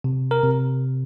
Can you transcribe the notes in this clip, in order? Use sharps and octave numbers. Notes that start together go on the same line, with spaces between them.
C3
A#4
C3